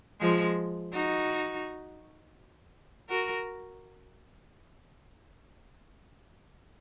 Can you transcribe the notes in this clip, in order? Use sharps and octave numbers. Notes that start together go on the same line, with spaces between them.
F3 G#3
D#4 F#4
F#4 A#4